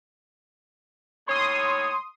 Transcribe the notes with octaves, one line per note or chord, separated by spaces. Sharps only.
D#2 A2 C#5 C6 D#6